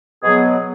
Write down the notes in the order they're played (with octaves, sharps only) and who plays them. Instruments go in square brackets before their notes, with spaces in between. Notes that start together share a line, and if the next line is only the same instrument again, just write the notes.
[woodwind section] B2 F#3 B3 G#4